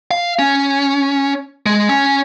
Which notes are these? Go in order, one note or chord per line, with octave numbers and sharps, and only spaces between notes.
F5
C#4
G#3
C#4